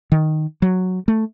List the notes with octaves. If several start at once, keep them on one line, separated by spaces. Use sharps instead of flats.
D#3
F#3
A3